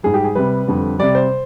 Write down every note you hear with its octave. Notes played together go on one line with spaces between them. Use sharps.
G#2 G3 G#4
G4
G#4
C3 G3 B4
F2 D3 G3
C3 G3 D5
C5